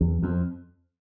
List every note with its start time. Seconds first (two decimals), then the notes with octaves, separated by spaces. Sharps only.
0.01 E2
0.23 F2